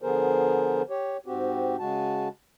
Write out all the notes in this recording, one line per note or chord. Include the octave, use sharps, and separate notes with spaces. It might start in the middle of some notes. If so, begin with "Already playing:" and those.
D3 F3 B3 G#4 A#4 C5
G4 C#5
G#2 C4 F#4 G4
C#3 G#3 F#4 A5